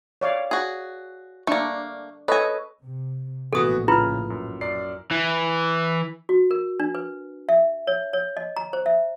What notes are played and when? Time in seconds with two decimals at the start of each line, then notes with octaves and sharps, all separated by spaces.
0.21 C#5 D5 F5
0.51 F#4 G#4
1.47 A3 A#3 D4 C#6
2.28 A4 B4 C#5 D#5 G#5
2.82 C3
3.53 A#1 A2 E3 B3 F#4 A4 D#6
3.88 C#3 E4 F4 B4 F6
4.30 F#2
4.61 F#2 D5 C7
5.11 E3
6.29 F#4
6.51 A#4
6.80 D4
6.95 B4
7.49 E5
7.87 C#5
8.13 C#5
8.37 D#5
8.56 A#5
8.73 C5
8.86 E5